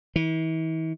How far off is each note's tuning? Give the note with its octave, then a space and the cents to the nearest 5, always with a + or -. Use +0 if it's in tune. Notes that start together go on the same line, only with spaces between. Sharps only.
E3 -40